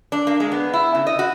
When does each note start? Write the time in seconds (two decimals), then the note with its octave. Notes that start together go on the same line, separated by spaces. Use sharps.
0.12 D4
0.27 A#3
0.40 G#3
0.52 B3
0.73 E4
0.95 C#3
1.07 D#5
1.19 F#4